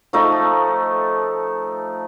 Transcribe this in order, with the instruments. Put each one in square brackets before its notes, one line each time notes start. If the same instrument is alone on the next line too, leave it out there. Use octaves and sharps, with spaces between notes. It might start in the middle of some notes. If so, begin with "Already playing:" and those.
[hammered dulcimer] F3 A3 D#4